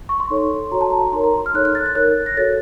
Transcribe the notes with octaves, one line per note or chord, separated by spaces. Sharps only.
C#6
C6
D#4 A4 C#5
F#4 A4 C#5 A#5
A5
A#5
D#4 A#4 C#5 C6
A#5
C6
F6
D#4 A4 C#5 F#6
F#6
A6
A6
D#4 A#4 C#5 F#6
A#6
F#4 A4 C#5 A6